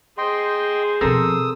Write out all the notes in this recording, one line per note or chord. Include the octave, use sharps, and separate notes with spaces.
G#4 C5 D#5 G5 C6
B2 F3 C4 A4 A#4 D#6 E6